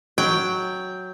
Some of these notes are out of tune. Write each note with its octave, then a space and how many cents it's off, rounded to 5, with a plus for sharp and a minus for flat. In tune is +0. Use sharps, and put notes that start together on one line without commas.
F#3 +0 G5 +0